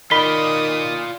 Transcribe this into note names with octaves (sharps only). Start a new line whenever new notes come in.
D#3 F4 D5 B5 D#6 B6 G7